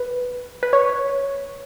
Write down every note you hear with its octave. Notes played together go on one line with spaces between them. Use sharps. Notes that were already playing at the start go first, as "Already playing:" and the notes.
Already playing: B4
B4
C#5